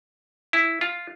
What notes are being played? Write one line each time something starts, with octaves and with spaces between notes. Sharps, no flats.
E4
F4